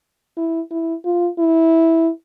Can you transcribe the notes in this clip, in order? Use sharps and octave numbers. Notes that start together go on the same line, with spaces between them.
E4
E4
F4
E4